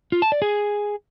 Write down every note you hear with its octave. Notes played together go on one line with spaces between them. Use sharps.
F4
A5
D5
G#4